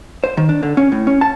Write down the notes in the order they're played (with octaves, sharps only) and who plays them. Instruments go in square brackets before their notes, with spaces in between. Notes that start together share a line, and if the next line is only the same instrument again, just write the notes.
[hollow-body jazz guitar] C5
D#3
D4
D3
C#4
A2
C#4
A5